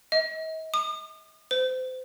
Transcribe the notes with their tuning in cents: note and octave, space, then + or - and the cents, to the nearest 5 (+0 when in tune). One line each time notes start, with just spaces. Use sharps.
D#5 +45
D#6 -45
C5 -30